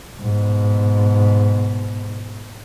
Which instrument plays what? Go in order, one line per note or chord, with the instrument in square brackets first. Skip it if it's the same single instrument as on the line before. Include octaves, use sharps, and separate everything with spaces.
[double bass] G#2 B2